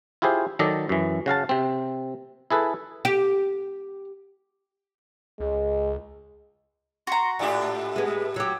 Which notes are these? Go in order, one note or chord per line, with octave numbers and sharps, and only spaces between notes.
E4 F4 G4 G#4 C5
D#3 F#3 A4 D5 D#5
F#2 E3
C#3 F#4 F5 A5
C3 C4
E4 G#4 A4 B4
G4
C#2 G#3
F#4 A#5 C6
G#2 D4 G4 D5
G#3 B3 B4
F#3 G4 E6